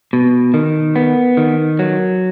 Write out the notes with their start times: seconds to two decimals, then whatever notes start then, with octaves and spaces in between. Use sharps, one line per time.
0.13 B2
0.54 D#3
0.96 B3
1.37 D#3
1.79 F#3